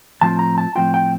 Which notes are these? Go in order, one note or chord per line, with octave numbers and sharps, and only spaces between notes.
A2 F3 C4 F4 A5
A#5
A5
A2 F3 C4 F4 G5
G5